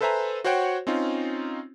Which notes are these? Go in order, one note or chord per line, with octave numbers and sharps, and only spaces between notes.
A4 B4 C5 E5 G#5 A#5
F#4 C5 C#5 F#5 G5
C4 C#4 D#4 F4